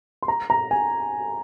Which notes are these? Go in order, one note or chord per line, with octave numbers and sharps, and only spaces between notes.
C6
A#5
A#5
G#5